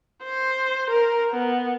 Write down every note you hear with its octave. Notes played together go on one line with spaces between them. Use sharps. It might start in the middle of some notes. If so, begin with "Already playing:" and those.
C5
A#4
B3